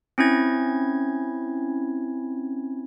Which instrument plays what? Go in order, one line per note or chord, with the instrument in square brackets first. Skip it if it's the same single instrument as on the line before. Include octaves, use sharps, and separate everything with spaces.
[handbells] C4 C#4 E4 G#6